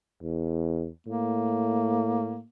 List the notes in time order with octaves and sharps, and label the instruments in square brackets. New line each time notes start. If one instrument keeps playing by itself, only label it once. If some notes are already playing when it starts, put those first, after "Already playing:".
[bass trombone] E2
[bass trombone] A2 [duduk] A#3